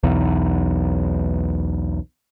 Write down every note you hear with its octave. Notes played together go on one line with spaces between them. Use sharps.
B1 E2